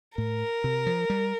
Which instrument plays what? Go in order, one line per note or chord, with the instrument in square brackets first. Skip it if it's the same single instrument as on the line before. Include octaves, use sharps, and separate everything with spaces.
[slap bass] A2 [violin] A#4
[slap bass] C3
F3
G3